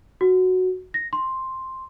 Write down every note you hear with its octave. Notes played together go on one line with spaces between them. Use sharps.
F#4
A#6
C6